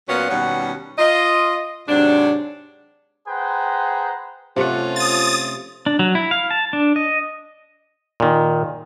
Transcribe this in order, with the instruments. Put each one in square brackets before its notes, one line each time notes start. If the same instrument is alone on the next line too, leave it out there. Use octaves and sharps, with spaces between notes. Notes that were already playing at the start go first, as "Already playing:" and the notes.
[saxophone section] A#2 F#3 B3 C#4 F5 F#5
D#2 B2 G3 C#4 F#5
F4 D#5
G#2 C3 F#3 D4
[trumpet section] G#4 B4 C5 F#5 G5 A#5
[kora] C3 A3 F#5 [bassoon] F3 [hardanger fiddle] C#4 F4
[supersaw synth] D#6 A6
[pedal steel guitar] D4
F#3
E4
F5
A5
D4
D#5
[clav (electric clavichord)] A#2 D#3